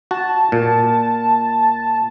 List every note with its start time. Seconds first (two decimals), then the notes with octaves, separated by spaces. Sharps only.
0.11 F#4 A5
0.52 A#2